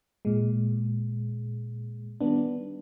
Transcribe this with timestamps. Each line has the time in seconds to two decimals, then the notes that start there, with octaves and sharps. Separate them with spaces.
0.25 A#2 G#3
2.21 D#3 G3 B3 D4